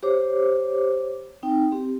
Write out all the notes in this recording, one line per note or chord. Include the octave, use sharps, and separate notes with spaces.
G4 C5 C#5 D6
C4 D#4 G5
C4 G4